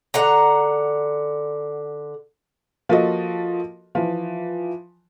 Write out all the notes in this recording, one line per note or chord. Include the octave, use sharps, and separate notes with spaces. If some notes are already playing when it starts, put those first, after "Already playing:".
D3 F#5 A#5
F3 A#3 F4 F#4 A4 D#5
E3 F3